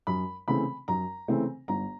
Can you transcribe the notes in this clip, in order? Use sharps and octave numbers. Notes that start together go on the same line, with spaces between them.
F#2 B5
C#3 E3 A3 C4 B5
F#2 A#5
C#3 E3 A3 C4
G1 A#5